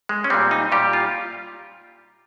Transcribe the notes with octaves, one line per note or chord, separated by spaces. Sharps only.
G#3
C#4
A#2 G3 C4
D#4
A#2 G3 G4
F4